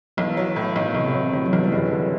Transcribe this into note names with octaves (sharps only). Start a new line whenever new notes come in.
B1 E3
F#3
A2
B1
B1 C3
C3
F#3
A2 D3
F#3
B1 E3
G3
F#1 F#3
D3